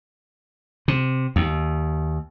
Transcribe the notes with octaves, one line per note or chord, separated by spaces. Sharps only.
C3
D#2